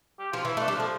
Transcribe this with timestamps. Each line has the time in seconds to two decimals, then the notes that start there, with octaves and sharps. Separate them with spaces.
0.19 G4
0.32 F3 F4
0.44 E3 E4
0.57 A3 D4
0.68 G3
0.76 F3 A3